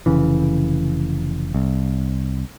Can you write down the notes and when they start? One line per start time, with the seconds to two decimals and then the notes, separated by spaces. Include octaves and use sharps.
0.06 F1 C#3 E3
1.54 C2